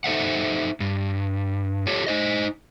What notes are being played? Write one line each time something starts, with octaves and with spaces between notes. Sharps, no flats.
D#4 A4 C5 E5 F#5
G2
F4 G4 A4 C#5
D#4 C5 D#5